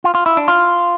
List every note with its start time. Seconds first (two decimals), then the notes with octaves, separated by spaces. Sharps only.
0.04 F4
0.15 F4
0.26 E4
0.37 D4
0.48 F4